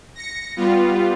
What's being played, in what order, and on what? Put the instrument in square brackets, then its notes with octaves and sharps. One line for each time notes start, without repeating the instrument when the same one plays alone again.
[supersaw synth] A#6 C#7
G3 B3 F4